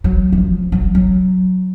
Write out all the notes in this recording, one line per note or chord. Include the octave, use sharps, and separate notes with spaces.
F#3
E3
F3
F#3
F#3